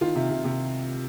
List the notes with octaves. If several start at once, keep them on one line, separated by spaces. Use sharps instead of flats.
D#3 F4
C3
C3
C3